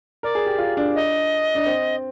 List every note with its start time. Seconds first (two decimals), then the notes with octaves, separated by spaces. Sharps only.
0.23 A#4 D5
0.35 G#4
0.46 G4
0.58 F4
0.77 D4
0.95 D#5
1.55 D4
1.66 C4